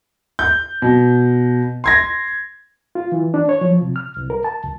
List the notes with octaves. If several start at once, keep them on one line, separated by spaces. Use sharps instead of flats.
G6
B2
C6 G#6 A#6
F4
E3
D4
C#5
F3
C3
F6
C2
A#4
A5
C#2